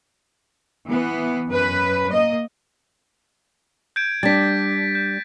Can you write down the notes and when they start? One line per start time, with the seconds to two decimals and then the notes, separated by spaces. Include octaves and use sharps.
0.88 E3 B3
1.48 F#2 B4
2.10 A#3 D#5
3.96 G6 G#6 D7
4.23 G3 D4 A6 B6
4.95 G6